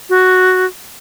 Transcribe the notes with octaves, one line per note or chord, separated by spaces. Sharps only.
F#4